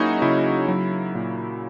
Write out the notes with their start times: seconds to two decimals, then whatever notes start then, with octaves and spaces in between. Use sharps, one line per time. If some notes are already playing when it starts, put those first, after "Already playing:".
Already playing: F#3 A#3 C#4 D#4 E4 F#4 G#4 C#5
0.22 C#3 E4
0.68 F#3
1.15 A#2